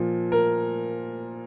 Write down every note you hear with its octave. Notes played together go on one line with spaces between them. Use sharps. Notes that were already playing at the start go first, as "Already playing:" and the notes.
Already playing: A#2 F3
A#4